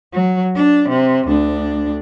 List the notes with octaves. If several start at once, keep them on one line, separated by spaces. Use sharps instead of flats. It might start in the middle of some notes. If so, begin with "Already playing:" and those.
F#3
D4
C3
D2 D4